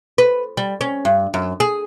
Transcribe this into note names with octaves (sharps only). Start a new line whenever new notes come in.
B4
G3
C#4
G2
F#2
G#4